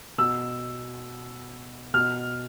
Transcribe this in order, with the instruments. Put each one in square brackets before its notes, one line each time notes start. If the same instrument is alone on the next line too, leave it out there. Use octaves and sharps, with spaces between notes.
[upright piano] B2 E6
B2 F6